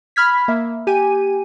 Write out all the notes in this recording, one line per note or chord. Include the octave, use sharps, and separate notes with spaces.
B5 F6 G#6 B6
A#3 E5
G4 G#5 D#7